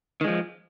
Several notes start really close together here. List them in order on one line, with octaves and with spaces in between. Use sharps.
D#3 G#3 F3